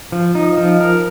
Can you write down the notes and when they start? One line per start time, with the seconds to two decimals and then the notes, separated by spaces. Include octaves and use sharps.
0.12 F3
0.35 D#4
0.57 F3
0.81 A#4